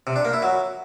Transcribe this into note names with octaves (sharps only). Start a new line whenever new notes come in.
C3
D4
A#3
E4
F#3